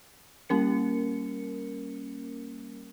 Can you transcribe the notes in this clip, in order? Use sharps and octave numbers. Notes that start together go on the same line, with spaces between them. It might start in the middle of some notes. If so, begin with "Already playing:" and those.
G3 A#3 C#4 A#4 C#7